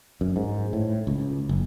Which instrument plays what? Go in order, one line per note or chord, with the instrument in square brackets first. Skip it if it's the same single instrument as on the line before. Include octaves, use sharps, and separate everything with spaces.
[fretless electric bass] F#2
G#2
A2
C#2
F#1